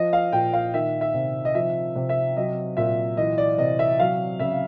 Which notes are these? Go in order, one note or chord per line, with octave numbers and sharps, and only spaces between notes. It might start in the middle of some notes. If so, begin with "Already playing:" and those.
Already playing: F3 D#5
F5
A#2 G5
F5
D#3 E5
E5
C3
D#5
F3 E5
C3
E5
F#3 D#5
A#2 E5
E3 D#5
D5
C3 D#5
E5
F#3 F5
C#3 E5